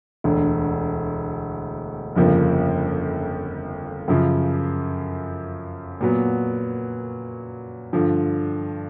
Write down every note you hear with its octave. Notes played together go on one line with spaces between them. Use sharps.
E1 D2 D3
G1 F2 C#3 F3 A#3
F#2 C#3 F3
A#2 F#3 B3
G2 D3 F3